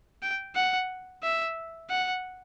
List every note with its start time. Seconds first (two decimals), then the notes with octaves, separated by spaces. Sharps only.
0.23 G5
0.55 F#5
1.23 E5
1.90 F#5